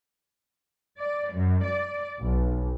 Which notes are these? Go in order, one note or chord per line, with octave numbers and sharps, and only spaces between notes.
D5
F#2
D5
B1